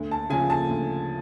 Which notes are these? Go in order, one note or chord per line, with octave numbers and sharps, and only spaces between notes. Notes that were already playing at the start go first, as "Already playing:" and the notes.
Already playing: D2
A5
C#3 F3 G#5
A5
D2